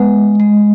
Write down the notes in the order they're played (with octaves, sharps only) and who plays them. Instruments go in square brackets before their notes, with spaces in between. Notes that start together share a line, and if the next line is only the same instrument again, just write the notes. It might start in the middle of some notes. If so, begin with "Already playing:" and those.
Already playing: [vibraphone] G#3 [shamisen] B3
[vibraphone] G#3